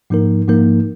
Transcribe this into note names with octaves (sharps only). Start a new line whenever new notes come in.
G#2 F3 A#3 D#4 A#4
G#2 F3 A#3 D#4 A#4